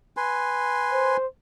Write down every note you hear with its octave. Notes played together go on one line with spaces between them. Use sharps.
B4 G#5 C6
C5